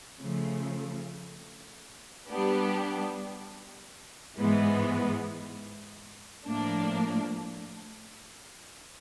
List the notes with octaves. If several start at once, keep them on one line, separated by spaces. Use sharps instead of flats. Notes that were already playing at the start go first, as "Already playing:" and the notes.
C#3 F3 A3
G3 B3 D4 G4
G#2 E3 G#3 B3
A2 F3 A#3 D4